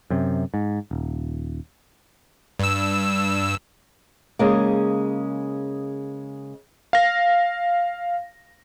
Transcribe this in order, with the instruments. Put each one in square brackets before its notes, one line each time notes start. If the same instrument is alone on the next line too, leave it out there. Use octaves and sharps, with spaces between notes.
[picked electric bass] F#2 C3
G#2
D#1
[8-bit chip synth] G2 E6
[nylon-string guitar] C#3 G#3 A#3
[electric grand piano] F5 A#6